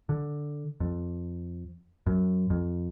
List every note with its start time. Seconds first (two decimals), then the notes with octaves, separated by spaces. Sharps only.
0.09 D3
0.80 F2
2.06 F#2
2.50 F2